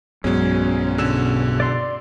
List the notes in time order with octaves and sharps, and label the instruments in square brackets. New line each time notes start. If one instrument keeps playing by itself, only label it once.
[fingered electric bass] B1 G2 B3 [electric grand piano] F#3 G#3 [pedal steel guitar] C#4
[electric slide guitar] B2 F#4 G#4 [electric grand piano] D3 E6 E7
[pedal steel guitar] D5 C6